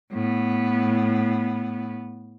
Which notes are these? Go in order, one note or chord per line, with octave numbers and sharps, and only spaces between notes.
A2 B3